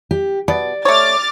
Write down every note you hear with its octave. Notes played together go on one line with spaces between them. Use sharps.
G4
B2 D5
A3 C#5 D6 F6 A6